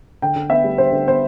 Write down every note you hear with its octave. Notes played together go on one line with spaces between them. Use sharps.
D3 G5
D3
B3 E5
G3
D3 C5
D3
B3 C5